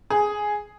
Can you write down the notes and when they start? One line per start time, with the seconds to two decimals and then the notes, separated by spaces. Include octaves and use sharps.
0.10 G#4